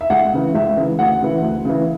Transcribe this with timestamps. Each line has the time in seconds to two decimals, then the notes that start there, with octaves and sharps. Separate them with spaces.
0.01 E5
0.10 C#2 F#5
0.33 C#3 E3
0.55 C#2 E5
0.77 C#3 E3
0.99 D2 F#5
1.21 C#3 E3
1.42 D2
1.65 C#3 E3